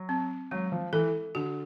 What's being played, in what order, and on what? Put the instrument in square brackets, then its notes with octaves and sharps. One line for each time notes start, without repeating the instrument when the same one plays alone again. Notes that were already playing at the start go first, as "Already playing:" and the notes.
Already playing: [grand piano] F#3
[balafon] C4
[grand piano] F#3 [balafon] G#3
[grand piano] F3
[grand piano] E3 [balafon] A4
[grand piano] D3 [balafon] F#4